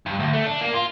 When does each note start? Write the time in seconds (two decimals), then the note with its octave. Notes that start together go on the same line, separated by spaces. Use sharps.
0.06 G2
0.19 D2
0.33 A3
0.46 D4
0.61 A#3
0.74 F4